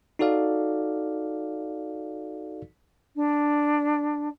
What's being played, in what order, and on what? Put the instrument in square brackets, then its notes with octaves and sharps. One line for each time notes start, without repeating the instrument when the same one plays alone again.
[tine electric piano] D#4 F#4 A4 D5 F5
[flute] D4